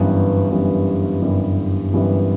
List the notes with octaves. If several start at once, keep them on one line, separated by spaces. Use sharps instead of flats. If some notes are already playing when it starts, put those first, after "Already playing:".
Already playing: G1 F#2 E3 G3 B3
G1 F#2 E3 G3 B3
G1 F#2 E3 G3 B3
G1 F#2 E3 G3 B3